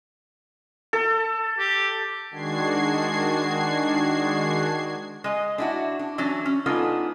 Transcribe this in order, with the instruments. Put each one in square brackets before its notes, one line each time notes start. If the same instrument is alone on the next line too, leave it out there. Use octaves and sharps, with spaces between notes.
[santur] A4
[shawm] G4
[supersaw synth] D#3 G#3 D4 F#4 G#6 C7
[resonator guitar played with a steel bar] G#3 D#5
D4 E4 F#4
D4
E3 F#3 C#4 D4
C#4
G#3 B3 D4 D#4 F4 A4